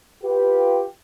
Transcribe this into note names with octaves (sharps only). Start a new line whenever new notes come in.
F4 G4 B4